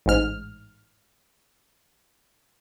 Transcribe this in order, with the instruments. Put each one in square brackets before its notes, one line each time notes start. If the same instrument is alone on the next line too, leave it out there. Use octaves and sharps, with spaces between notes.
[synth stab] A1 G#2 F6